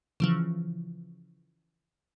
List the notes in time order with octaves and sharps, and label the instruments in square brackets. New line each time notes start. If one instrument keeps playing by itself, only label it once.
[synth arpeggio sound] C#3 E3 F3